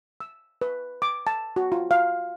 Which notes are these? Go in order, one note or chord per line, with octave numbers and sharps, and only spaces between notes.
E6
B4
D6
A5
F#4
F4
F5